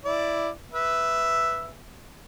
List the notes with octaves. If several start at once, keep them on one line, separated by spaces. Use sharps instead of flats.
E4 D5
B4 E5